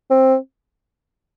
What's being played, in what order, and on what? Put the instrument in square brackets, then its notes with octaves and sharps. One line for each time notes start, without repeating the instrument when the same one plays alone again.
[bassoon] C4